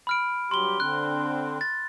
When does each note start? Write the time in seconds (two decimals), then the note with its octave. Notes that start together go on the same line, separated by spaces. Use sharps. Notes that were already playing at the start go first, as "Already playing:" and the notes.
0.07 B5 F6 D7
0.51 G2 F#3 G4 C6 G7
0.80 D3 C4 D4 F#6
1.61 A6